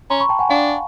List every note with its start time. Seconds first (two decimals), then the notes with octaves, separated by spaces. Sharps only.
0.10 C#4 A#5 C6
0.20 B5 C#6
0.29 G5 A5
0.39 F#5 G#5
0.49 D4 F5 G5